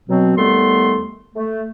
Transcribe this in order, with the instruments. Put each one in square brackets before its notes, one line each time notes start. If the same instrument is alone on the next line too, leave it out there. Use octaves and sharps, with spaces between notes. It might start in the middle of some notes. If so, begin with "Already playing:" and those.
[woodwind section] B2 F#3 C4
D#2 G3 A3 B3 A4 C6
A3